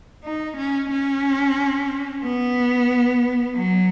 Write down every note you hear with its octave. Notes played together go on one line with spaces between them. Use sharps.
D#4
C#4
C#4
B3
F#3